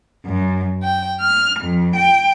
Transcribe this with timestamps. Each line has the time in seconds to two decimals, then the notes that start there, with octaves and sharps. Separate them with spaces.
0.25 F#2
0.83 G5
1.20 F6
1.60 F2
1.96 G5